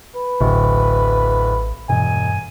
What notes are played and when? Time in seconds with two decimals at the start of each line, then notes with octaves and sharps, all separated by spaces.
0.15 B4
0.40 D1 A1
1.89 E1 G2 G#5